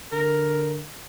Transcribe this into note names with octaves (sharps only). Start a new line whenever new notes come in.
D3 A#4